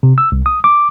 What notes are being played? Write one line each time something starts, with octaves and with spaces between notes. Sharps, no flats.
C3
E6
C2
D#6
D6